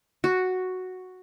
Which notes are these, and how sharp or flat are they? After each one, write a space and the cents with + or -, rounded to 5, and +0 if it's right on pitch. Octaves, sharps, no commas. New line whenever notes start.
F#4 +0